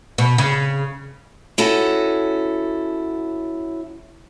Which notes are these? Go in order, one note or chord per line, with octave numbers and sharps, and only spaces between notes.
B2
C#3
C#4 E4 F#4 A4